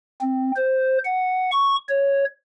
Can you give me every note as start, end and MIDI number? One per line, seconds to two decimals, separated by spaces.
0.21 0.51 60
0.56 0.98 72
1.05 1.51 78
1.51 1.75 85
1.89 2.25 73